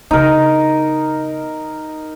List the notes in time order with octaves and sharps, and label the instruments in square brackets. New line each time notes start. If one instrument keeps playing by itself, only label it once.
[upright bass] C#3 B3 [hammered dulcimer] D#4 A#4